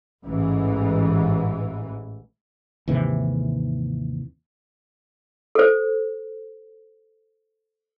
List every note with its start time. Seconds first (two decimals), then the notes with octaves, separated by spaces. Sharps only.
0.25 A1 G#2 E3
2.88 D#2 G#2 C3 E3
5.55 A4 C5